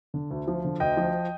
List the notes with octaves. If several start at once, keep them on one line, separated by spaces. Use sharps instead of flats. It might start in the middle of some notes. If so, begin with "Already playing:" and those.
D3
D2
F3
D3
D2 D#5 G5
F3